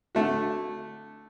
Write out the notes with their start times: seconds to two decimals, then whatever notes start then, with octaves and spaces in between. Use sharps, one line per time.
0.15 D3 A3 F#4